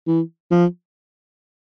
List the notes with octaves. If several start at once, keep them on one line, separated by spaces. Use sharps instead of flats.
E3
F3